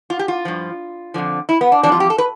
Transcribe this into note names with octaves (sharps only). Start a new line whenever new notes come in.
F4
G4
F4
G2 F3
F2 D3 F3
E4
B3
D4
F2 E3 G3 D4
F4
G4
A4
B4